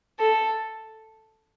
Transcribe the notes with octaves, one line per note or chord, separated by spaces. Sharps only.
A4